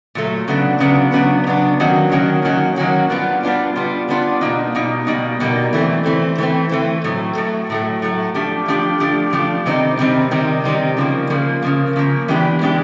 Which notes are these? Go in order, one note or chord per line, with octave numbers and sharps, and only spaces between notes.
A#2 F#3 A3
C#3 F#3 B3 D4
C#3 F#3 B3 D4
C#3 F#3 B3 D4
C#3 F#3 B3 D4
D#3 F#3 A#3 C#4 F#4
D#3 F#3 A#3 C#4 F#4
D#3 F#3 A#3 C#4 F#4
D#3 F#3 A#3 C#4 F#4
G3 B3 D4 F4
G3 B3 D4 F4
G3 B3 D4 F4
G3 B3 D4 F4
B2 G3 A#3 D#4
B2 G3 A#3 D#4
B2 G3 A#3 D#4
B2 G3 A#3 D#4
E3 A3 C4
E3 A3 C4
E3 A3 C4
E3 A3 C4
A2 F#3 A3
A2 F#3 A3
A2 F#3 A3
A2 F#3 A3
F3 A3 D4 G4
F3 A3 D4 G4
F3 A3 D4 G4
F3 A3 D4 G4
C3 D#3 G3 C4 D#4
C3 D#3 G3 C4 D#4
C3 D#3 G3 C4 D#4
C3 D#3 G3 C4 D#4
C#3 F3 A#3
C#3 F3 A#3
C#3 F3 A#3
C#3 F3 A#3
E3 G#3 B3 D4 G4
E3 G#3 B3 D4 G4